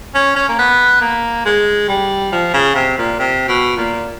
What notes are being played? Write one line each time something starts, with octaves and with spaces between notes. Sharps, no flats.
C#4
C#4
A#3
B3
A#3
G#3
G3
F3
C#3
C3
A#2
C3
B2
A#2